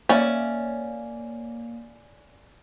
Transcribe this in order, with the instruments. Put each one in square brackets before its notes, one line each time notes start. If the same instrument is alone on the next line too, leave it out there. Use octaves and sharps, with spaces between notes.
[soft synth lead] A#3 [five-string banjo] C#4 [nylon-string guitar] C#5 D5 E5